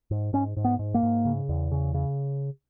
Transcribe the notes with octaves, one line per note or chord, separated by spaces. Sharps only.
G#2
G#2 C#4
G#2
B3
G#2
A#3
G#2
C#3
E2
C#3
C#3